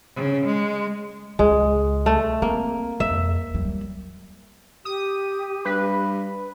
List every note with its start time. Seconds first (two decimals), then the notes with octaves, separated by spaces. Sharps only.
0.16 C#3
0.46 G#3
1.39 C#2 G#3
2.06 A3
2.42 A#3 C4
3.00 F2 E5
3.55 F#3 G3
4.85 G4 D#6
5.65 G2 B4